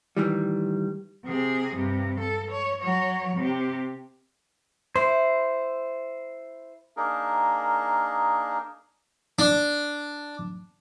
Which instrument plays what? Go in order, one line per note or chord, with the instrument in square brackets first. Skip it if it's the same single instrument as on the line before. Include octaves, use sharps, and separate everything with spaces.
[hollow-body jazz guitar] A2 D#3 E3 G3
[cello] C3 G#4
G2 C3
A4
C#5
F#3 C#5
C3 G4
[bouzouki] E4 [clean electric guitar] C5
[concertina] A#3 D4 D#4 G#4 A#4
[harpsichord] D4